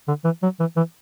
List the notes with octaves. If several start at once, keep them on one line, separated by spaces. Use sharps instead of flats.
D3
E3
F#3
E3
E3